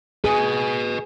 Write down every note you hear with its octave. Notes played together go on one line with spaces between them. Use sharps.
G#4 B4 D#5